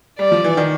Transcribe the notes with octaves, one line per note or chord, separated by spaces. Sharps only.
G3 D5
F3
E3
D#3